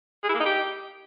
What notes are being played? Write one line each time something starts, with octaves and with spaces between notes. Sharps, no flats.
G#4
E4
A#3
D#4
G4